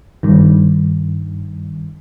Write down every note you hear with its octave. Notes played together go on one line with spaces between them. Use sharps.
G2 D#3